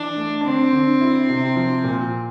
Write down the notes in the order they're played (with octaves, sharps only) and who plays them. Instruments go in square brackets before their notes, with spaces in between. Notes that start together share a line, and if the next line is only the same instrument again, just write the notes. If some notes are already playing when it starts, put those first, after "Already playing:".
Already playing: [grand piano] E3 [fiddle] D4
[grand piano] A3
[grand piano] D3 [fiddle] C4
[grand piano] D3
E4
C3
F3
A#2